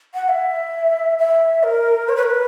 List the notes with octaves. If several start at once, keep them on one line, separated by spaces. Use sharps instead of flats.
F#5
E5
E5
A#4
C#5
B4
A#4
B4